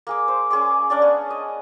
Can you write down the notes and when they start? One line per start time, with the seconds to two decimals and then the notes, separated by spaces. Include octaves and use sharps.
0.07 A#3 G#4 D6
0.28 C5
0.51 C#4 G#4 C6 D6
0.90 C#4 D4 D5
1.02 B3
1.30 D#5